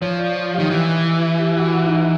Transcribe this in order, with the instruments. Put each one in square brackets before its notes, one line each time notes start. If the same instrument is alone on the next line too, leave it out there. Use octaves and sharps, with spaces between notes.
[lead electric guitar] F3 [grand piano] C#5
[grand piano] D5
[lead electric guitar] D#3 [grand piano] G4
[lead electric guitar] E3
[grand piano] G4
F#4
F#4
D#4
E4